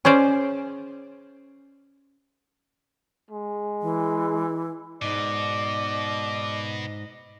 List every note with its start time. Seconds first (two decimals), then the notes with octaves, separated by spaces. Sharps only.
0.05 C#4 G#4 C5 D5
3.31 G#3
3.82 E3
5.02 G#2 B2 D5 D#5